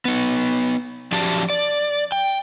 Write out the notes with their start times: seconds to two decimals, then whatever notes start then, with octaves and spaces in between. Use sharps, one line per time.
0.05 B3 D#4
1.12 F3 F#3 C#4 G4 D5 A5
1.50 D5
2.12 G5